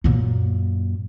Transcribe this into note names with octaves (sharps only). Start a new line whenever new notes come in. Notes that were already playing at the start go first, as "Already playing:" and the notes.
F#2 A#2